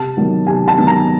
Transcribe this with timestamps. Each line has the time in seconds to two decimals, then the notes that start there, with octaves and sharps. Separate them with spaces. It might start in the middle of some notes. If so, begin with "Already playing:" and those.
Already playing: C3 A5
0.17 D#3 F#3 B3
0.47 C3 G#5
0.68 A5
0.78 D#3 F#3 B3
0.87 A#5